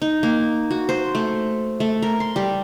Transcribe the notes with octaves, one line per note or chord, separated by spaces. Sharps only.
D#4
A#3
F#4
C5
A3
A3
A#4
C6
G3